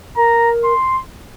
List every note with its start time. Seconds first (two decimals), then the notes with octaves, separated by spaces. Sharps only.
0.17 A#4 A#5
0.64 C6